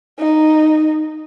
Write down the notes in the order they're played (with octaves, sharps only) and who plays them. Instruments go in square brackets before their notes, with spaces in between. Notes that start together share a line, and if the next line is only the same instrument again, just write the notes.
[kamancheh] D#4